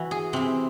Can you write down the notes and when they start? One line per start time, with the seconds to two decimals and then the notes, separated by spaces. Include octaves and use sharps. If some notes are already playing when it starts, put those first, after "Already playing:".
Already playing: E3 E4 F#4
0.11 G#4
0.33 C3 E3 C4